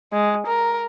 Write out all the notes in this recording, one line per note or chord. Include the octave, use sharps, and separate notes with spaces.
G#3
A#4